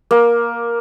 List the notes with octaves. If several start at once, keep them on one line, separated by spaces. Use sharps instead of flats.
A#3